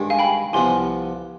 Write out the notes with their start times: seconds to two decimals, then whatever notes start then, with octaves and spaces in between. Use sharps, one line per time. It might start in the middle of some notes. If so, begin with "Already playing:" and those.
Already playing: G2 D#3 G#3
0.10 F5 G#5
0.19 G5 B5
0.53 C2 C3 F3 B3 G#5 C6